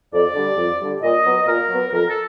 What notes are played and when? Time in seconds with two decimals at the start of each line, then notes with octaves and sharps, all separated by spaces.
0.12 F2 D5
0.35 D3 G3
0.57 F2
0.80 D3 G3
1.02 A#2 D#5
1.25 F#3 B3
1.47 A#2 A#4
1.70 F#3 B3
1.92 F2 A#4
2.07 A4